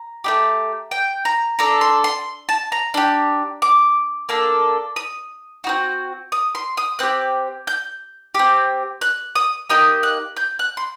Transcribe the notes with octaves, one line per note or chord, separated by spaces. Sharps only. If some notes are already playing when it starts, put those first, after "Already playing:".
Already playing: A#5
A3 D#4 G4
G5
A#5
D4 A4 A#5
C6
C6
A5
A#5
D4 G4
D6
A#3 D4 A4
D#6
C4 D#4 F#4
D#6
C6
D#6
C4 G4 F#6
G6
C4 G4
F#6
D#6
A#3 D#4 G4 D#6
F#6
G6
F#6
C6